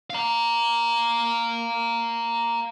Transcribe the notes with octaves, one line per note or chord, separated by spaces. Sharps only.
F5 A#5